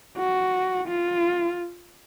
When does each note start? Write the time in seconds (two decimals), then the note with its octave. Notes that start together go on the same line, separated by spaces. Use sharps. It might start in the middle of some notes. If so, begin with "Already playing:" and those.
0.18 F#4
0.88 F4